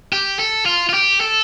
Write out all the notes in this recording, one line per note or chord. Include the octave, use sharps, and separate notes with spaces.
G4
A4
F4
F4
G4
A4